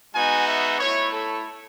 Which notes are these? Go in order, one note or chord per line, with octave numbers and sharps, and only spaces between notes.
G#3 B3 D#4 F#4 G#5
E5
A3 E4 C#5
A4